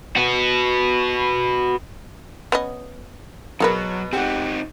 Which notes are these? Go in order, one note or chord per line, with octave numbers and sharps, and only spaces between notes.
F#4 B4
B3 C#4 D#5
B2 F#3 B3 G#4 A#4 B4
C4 D#4 G4 F#5